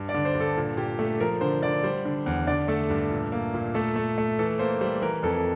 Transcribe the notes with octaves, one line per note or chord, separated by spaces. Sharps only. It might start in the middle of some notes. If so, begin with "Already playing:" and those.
Already playing: G2
D5
D3
C5
G2
A4
A#2
A#2 G4
A3 A4
F3 A#4
D3 C5
D3 D5
G3 C5
D3
E2
D3 D5
A3 A4
G2
A#2
A#3
A#2
A3 A4
A3
A3
E3 A4
A#3 C5
G3 C5
E3 A#4
F2 A4